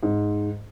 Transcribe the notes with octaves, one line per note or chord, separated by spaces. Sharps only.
G#2